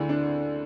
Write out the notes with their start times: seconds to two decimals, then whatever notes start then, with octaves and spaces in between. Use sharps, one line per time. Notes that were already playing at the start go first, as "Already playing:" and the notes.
Already playing: D2 D3 E4
0.09 D4